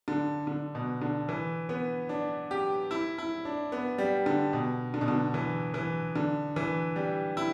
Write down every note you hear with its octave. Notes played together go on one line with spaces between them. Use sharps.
D3
D3
B2
D3
E3
B3
D4
G4
E4
E4
D4
B3
G3
D3
B2
D3
B2
D3
E3
E3
D3
E3
G3
E4